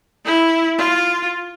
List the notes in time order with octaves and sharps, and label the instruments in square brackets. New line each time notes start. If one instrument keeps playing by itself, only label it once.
[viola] E4
F4